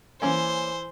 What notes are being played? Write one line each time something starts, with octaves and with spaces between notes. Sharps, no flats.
E3 A#3 C#4 C5 G#5